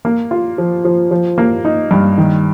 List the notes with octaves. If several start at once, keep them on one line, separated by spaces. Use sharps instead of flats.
A#3
F4
F3
F3
F3
A#3
D#4
G2
D#3